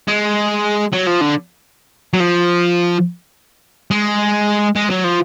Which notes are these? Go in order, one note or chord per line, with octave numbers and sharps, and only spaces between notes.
G#3
F#3
F3
D3
F#3
F3
G#3
G#3
F#3
F3